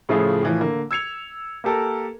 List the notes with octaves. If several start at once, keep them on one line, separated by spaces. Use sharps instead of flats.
A2 C#3 F3 A3 F4 G#4
A2 E3 F3
D3 A#3
E6 G#6 C#7 F7
A#3 G4 A4 A#4